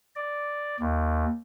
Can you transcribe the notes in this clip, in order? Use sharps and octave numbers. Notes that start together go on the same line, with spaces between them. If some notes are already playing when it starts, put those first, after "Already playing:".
D5
D#2